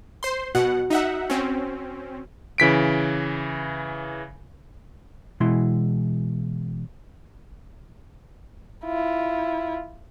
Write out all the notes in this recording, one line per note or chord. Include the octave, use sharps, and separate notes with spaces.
C5 C6
B2 F#4 F#5
D#4 E5 F#5
C4 C#4
C#3 E3 B6 D7
B2 E3 G#3 E4 C6
E4 F4